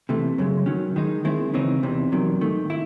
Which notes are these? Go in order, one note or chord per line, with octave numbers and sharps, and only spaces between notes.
C3 E3 A3
F#2 C#3 G#3
D#3 F#3 C#4
D#3 G#3 D#4
D#3 G#3 C4 E4
C#3 E3 C4 D#4
E2 C3 E3
E2 C3 D#3 F#3
G#2 D#3 A3
E4